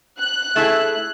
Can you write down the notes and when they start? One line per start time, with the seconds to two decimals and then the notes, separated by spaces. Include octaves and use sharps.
0.20 F#6
0.56 A3 E4 G#4 E5